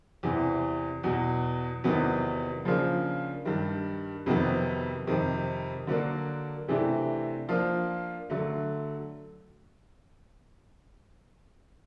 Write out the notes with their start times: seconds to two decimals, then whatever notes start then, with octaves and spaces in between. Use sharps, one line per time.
0.23 E2 C3 E3
1.04 E2 B2 F#3
1.84 E2 C3 D#3 F#3 B3
2.65 C#3 F3 A#3 D4 F4
3.45 G2 D#3 G3
4.26 F2 C3 D#3 F#3 B3
5.07 F2 C3 D#3
5.87 D3 F#3 A#3 D4
6.68 C3 E3 A3 D4 G4
7.49 F3 A#3 D4 F4
8.30 D3 F#3 A3